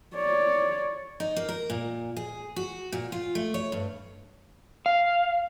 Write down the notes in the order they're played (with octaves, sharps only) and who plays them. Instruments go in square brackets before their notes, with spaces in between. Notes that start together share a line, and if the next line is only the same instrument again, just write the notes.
[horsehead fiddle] C#5 D5
[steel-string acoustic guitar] D#4
A#3
A#4
A#2
G#4
F#4
A#2
F4
A3
C#5
G2
[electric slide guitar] F5